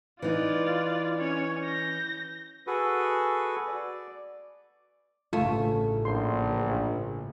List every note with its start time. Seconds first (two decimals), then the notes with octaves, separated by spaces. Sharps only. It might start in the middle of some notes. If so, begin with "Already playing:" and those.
0.22 E3 D#4 F4 D5
1.19 C#4 C#5
1.63 G6 A#6
2.67 F#4 G#4 A4 B4
3.68 D5
5.33 A1 G2 C#3 A3 F4
6.05 A#1 C6